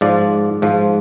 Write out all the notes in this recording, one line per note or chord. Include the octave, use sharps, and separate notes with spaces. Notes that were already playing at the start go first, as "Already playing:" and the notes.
G#2 F3 D5
G#2 F3